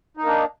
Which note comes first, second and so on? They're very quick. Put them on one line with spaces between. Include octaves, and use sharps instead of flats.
D#4 A#3 D4